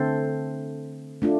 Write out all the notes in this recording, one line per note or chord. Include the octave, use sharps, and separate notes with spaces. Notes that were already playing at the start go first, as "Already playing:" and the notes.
Already playing: D3 A3 C4 A4 C5
A3 D4 F4